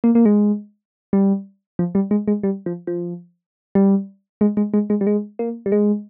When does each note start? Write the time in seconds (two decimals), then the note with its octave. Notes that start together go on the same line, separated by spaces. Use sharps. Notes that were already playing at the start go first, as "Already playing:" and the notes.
0.04 A#3
0.15 A#3
0.25 G#3
1.13 G3
1.79 F3
1.95 G3
2.11 G#3
2.28 G#3
2.43 G3
2.66 F3
2.87 F3
3.75 G3
4.41 G#3
4.57 G#3
4.74 G#3
4.90 G#3
5.01 G3
5.07 G#3
5.39 A#3
5.66 G3
5.72 G#3